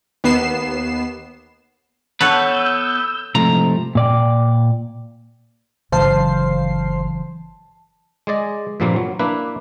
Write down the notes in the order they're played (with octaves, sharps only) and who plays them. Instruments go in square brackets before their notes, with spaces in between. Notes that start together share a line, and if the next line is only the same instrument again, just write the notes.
[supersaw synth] D#2 B3 C7 E7
[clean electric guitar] B3 B4 [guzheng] A4 C#5 F#5 [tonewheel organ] E6 G6
[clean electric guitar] C2 G#2 A#5 [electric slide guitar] C3 F3 A3
[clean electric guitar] A#2 D5 G5
[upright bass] G1 [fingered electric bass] C#3 E3 F#3 [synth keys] C5 F5 C7 [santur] A5
[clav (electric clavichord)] G#3 G#4 D5 D#5
G2 A#2 F3 G3 A#3 C4
F#3
A#3 D4 E4 B4